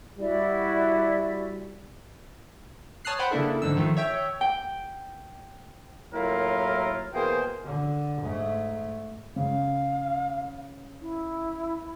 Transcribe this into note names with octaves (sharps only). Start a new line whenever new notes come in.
G3 E4 F#4 D5
C#5 A5 D#6 F6 F#6 C7
B4 C5 F#5 G5 B5
C#3 A#3 D4 E4 A4
F2 G#2 D3 E6
D#3 F3 A3
C#5 E5 G5
G5
A2 F#3 A#3 E4 F4 A#4
B2 E3 A#3 G#4 C5 G5
D3
G#2 A3
C#3 F5
E4